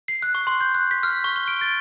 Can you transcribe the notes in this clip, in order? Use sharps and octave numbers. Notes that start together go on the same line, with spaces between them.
C7
F#6
C#6
C6
G6
F#6
B6
F6
C#6
G7
D7
A6